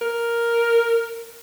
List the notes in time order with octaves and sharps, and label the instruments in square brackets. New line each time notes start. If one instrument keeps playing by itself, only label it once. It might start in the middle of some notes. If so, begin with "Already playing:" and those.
[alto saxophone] A#4